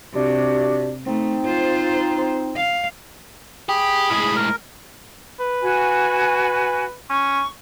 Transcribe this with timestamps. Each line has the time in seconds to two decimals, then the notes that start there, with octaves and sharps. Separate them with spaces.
0.14 C3 D4 F#4 G4
1.06 A3 C4 D#4
1.46 F4 C5
2.57 F5
3.69 G4 G#4 B5
4.10 A2 G#3
4.36 A#4
5.40 B4
5.62 F#4 G#5
7.10 C#4 C#6